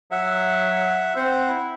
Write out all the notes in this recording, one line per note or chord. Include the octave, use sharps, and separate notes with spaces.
F#3 E5 F#5
C4 C5 F#5
E4